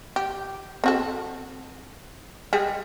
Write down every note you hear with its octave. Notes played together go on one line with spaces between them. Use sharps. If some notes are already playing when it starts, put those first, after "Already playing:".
G4
C4 F#4 A4
G3 G#3 G#4